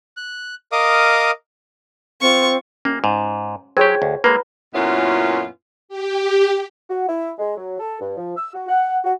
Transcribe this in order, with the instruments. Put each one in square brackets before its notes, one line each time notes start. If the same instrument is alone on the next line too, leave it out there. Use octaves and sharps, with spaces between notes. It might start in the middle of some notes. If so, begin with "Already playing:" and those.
[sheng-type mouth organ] F#6
A#4 D#5 F5 D6 D#6
[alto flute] C4 [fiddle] F4 C#6
[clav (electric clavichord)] A#3 [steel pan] C#4
[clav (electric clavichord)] G#2
[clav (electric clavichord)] F#3 G4 [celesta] G#4 G5 G#6 [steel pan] C5 C#5
[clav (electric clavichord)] D2
[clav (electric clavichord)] G#3 A#3 [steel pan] B4 [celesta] A#5
[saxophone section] F#2 A#2 B3 C#4 E4 F4
[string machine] G4
[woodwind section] F#4
E4
G#3
F#3
A4
G2
F3
E6
F#4
F#5
F#4